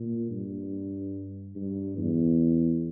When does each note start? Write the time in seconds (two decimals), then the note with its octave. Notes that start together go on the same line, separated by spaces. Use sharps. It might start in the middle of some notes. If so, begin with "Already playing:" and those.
Already playing: A#2
0.31 G2
1.55 G2
1.97 E2